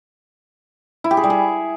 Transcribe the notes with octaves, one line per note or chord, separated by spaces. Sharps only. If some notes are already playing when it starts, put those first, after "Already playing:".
E4
G4
G#4
G3
G#4